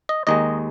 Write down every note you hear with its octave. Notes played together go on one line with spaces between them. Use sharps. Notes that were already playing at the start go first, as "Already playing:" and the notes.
D#5
D#2 D#3 G#3 D#5